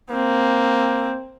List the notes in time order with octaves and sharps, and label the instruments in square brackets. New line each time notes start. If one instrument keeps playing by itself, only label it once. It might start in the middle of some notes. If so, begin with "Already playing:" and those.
[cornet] A#3 [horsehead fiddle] C4